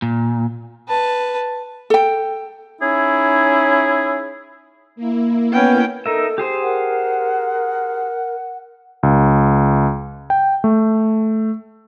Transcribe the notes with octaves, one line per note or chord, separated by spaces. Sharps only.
A#2
B4 A5
A4 G5
C#4 D#4 E4 G#4
A#3 E4
B3 C#4 G5
D#4 A4 A#4 E5
G4 G#4 C5
A#4 F#5
C#2
G5
A3